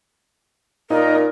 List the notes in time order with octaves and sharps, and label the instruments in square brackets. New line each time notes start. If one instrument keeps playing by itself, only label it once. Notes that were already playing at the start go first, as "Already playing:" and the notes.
[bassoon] A#2 [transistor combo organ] D#4 [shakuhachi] A#4